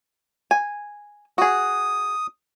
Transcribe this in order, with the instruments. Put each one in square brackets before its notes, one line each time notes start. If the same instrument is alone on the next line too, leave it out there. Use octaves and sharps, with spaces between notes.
[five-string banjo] G#5
[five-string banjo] F#4 G#4 [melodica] D#6